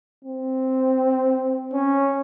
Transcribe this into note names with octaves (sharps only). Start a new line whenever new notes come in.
C4
C#4